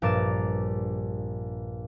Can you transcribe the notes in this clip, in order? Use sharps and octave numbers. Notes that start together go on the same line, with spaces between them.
A#1 G2 A#4 D6 A6 E7